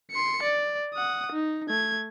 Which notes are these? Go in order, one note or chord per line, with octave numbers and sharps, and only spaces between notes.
C6 C#7
D5
F#5 D#6
D#4
A3 G#6